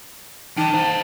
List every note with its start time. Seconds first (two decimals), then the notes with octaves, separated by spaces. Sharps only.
0.58 D#4 G5 A5
0.74 C5 D#5